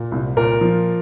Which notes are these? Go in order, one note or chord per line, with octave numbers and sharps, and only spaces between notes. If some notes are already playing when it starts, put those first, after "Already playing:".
Already playing: A#2
C2
A#2 A#4
F3